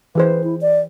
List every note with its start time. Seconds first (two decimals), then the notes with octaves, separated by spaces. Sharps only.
0.15 E3 G#4 B4 C5
0.44 E4
0.61 D5